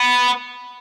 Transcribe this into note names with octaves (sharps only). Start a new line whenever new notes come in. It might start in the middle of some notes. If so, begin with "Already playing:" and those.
Already playing: B3